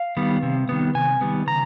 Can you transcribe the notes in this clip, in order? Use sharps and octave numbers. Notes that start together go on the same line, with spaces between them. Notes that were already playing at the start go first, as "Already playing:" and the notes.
Already playing: F5
D#3 G3 B3
C3
D#3 G3 B3
C3 G#5
D#3 G3 B3
C#3 A#5